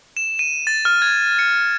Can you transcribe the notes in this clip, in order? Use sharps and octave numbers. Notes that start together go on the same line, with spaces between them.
E7
D#7
A6
F6
G#6
C#7